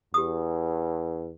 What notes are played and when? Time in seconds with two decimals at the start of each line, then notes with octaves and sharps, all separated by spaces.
0.14 E2 G4 D#6